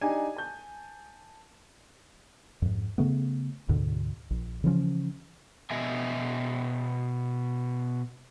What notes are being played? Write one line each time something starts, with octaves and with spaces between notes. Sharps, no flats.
D4 D#4 G4 G#5
A5 G6
F2 G#2
C#3 A3 B3
D2 G#2 B2 D3
A#1
C#3 E3 F3 C#4
B2 B3 D#5 E5 G#5